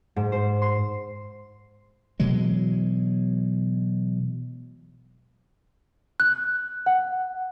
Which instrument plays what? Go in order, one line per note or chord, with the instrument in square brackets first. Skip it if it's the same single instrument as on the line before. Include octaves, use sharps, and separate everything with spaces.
[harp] G#2
C5
C6
[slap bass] B2 E3 F#3 G#3
[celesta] F#6
F#5